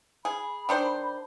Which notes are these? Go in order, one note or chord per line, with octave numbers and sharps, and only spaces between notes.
G#4 B5
D#3 D4 C5